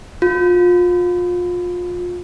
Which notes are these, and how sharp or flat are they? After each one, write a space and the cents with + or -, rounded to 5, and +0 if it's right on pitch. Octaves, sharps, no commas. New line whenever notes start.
F4 +30